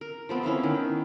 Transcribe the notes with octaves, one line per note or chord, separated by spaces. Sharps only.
A#4
F3 A3 B3 C4
C#4 E4 E5 F5
D#3